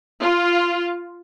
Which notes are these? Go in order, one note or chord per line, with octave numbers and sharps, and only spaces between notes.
F4